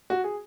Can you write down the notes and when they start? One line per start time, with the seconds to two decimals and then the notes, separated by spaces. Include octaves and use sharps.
0.10 F#4
0.24 G#4